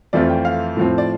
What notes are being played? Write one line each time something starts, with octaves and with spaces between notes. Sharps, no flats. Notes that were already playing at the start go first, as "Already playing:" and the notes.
F2 E3 A3 C4 F4 D5
G5
F5
A2 F3 C4
D5